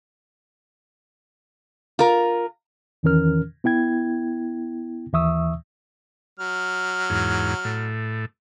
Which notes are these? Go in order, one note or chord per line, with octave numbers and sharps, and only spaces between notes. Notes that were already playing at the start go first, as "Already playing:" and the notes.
F4 A#4
E2 D#3 E3 C#4 A#4 F6
B3 E4 G5 G#6
D#2 E3 E5 C#6 D#6 E6
F#3 F6
E2 G#2
A2